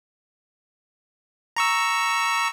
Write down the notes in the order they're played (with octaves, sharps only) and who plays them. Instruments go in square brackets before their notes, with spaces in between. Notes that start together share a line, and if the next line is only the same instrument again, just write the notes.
[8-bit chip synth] A#5 C#6 E6